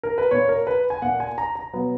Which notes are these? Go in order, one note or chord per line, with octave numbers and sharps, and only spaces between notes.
A#4
B4
A#2 A#3 C#5
A#4
B4
G#5
A#2 A#3 F#5
G#5
A#5
A#5
B2 F#3 B3